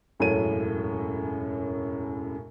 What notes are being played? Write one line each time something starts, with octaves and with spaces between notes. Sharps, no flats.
E1 F#2 A2 A4 C#5 D#7